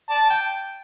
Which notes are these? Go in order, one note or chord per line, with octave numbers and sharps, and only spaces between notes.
D5 A5
G5